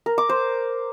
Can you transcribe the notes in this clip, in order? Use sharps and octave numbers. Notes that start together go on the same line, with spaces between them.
A#4
D6
C5